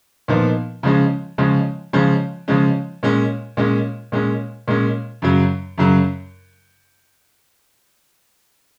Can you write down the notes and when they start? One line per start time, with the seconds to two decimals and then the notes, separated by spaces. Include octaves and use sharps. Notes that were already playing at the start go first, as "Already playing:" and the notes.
0.28 A#2 F3 B3 D#4
0.83 C#3 F3 G#3 C#4
1.38 C#3 F3 G#3 C#4
1.93 C#3 F3 G#3 C#4
2.48 C#3 F3 G#3 C#4
3.03 A#2 G#3 C#4
3.57 A#2 G#3 C#4
4.12 A#2 G#3 C#4
4.68 A#2 G#3 C#4
5.22 F#2 C#3 F#3
5.78 F#2 C#3 F#3